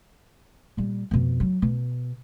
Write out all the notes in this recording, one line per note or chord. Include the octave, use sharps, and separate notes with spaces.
A#2 G3
F2 B2
F#3
B2